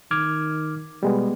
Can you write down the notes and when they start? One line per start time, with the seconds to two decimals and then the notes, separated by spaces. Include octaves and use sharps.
0.11 D#3 D6 F6 G#6
1.03 B2 G3 G#3 B3